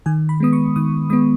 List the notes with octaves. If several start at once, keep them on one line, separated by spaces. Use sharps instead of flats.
D#3 G#5
B5
G#3 B3 D#6
C#6
D#3 D#6
G#3 B3 D#6